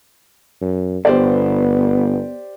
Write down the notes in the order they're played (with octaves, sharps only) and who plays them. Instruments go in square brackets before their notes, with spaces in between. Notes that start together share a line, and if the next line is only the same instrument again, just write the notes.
[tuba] F#2
[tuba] G1 [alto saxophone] B3 [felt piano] G4 C5 D5